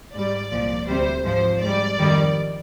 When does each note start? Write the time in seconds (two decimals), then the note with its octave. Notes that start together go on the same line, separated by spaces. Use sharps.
0.13 G#2 G3 D5
0.50 C2 A#2 F3
0.87 D2 C3 G3 C5
1.24 G#2 F3 C5
1.60 G#2 G3 D5
1.98 F2 D#3 G3